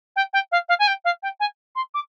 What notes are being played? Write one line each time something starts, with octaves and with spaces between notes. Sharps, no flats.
G5
G5
F5
F5
G#5
G5
F5
G5
G#5
C6
D6